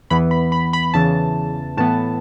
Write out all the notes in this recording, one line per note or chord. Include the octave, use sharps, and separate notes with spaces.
E2 E3 B3 B5
B5
B5
B5
E2 C#3 E3 A5
A2 E3 B3 A5